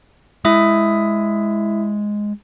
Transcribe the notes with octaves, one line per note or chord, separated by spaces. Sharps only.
G#3 E4 E5 D#6